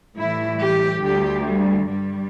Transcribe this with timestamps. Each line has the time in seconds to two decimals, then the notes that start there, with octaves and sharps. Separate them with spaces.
0.17 A2 E3 G3 E4
0.60 G4
1.02 D2 D3 G3 G4
1.45 G3
1.87 G2 G3